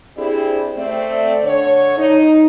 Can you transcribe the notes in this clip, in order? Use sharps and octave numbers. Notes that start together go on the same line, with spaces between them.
C4 D4 E4 G4 G#4
A3 C4 D5
D3 C#5
D#4